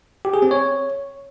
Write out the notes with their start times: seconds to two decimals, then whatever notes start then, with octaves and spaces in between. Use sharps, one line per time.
0.25 G4
0.34 G#4
0.42 C4
0.51 C#5